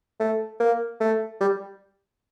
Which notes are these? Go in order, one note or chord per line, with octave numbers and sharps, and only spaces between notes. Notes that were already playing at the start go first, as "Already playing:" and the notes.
A3
A#3
A3
G3